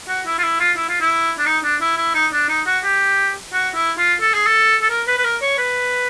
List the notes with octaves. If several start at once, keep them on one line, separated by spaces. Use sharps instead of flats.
F#4
E4
F4
E4
F4
E4
F4
E4
D4
D#4
D4
E4
E4
D#4
D4
D#4
F#4
G4
F#4
E4
F4
A4
G#4
A4
A4
A#4
B4
B4
A#4
C#5
B4